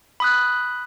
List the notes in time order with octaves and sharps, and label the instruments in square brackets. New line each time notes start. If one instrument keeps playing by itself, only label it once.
[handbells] B5 D#6 F#6